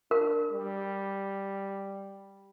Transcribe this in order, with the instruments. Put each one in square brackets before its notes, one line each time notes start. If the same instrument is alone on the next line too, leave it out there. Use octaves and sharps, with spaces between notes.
[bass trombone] D4 [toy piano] A#4
[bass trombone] G3